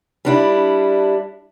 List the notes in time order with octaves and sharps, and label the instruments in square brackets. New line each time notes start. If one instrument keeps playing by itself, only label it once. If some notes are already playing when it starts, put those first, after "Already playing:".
[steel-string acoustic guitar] G3 D4 E4